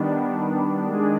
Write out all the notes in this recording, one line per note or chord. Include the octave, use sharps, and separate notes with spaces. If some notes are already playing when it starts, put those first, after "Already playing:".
Already playing: D#3 G3 B3 D4
D#3 G#3 D4 G#4